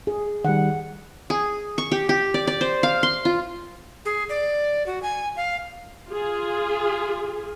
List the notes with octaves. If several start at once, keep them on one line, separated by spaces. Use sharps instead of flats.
G#4
D#3 G3 F#5
G#4
C#6
G4
G4
D5
D5
C5
F5
C6
F4
G#4
D5
F#4
G#5
F5
F4 G#4